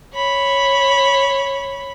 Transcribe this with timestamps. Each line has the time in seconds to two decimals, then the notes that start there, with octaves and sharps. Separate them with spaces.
0.14 C#5 B5